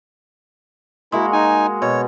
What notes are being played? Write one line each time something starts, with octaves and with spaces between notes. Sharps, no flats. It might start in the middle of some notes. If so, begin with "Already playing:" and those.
G#3 A#3 E4 F#4
D#4 G#5
B2 C#5